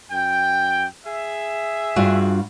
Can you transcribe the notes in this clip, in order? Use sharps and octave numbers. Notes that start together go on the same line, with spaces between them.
F#2 G5
G#4 E5
G2 F4 F#4